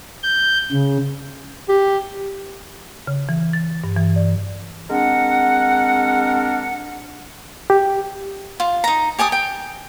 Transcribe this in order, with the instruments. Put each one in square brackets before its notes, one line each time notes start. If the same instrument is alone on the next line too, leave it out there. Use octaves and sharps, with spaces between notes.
[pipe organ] G6
C#3
[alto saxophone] G4
[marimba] C#3
E3
A6
G2
E3
D5
[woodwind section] G#3 C4 D4 A#4 F#5
[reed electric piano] G4
[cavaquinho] F4
D#4 A#5
G4 G#5 A5 D#6
G5